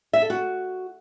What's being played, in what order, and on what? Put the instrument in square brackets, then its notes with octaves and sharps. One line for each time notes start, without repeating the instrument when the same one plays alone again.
[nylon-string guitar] E5
A4
F#4